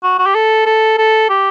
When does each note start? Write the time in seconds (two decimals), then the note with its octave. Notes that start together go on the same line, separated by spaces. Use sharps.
0.03 F#4
0.19 F#4
0.26 G4
0.35 A4
0.66 A4
0.98 A4
1.30 G4